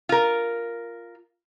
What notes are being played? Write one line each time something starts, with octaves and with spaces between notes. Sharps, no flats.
F4 A#4